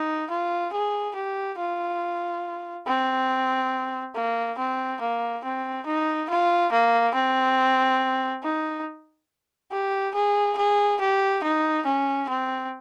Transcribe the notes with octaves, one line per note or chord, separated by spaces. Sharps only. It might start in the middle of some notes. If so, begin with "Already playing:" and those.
Already playing: D#4
F4
G#4
G4
F4
C4
A#3
C4
A#3
C4
D#4
F4
A#3
C4
D#4
G4
G#4
G#4
G4
D#4
C#4
C4